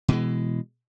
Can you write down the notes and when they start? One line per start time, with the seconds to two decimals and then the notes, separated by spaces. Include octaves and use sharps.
0.08 B2 E3 G#3